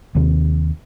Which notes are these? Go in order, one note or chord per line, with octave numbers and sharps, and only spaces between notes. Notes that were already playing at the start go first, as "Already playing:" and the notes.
D#2 C3